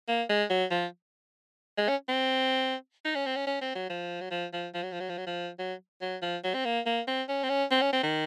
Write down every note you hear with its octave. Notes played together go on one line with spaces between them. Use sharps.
A#3
G#3
F#3
F3
G#3
C#4
C4
D#4
C#4
C4
C#4
C#4
C4
F#3
F3
F#3
F3
F3
F3
F#3
F3
F#3
F3
F#3
F3
F#3
F#3
F3
F#3
C4
A#3
A#3
C4
C#4
C4
C#4
C4
C#4
C4
D#3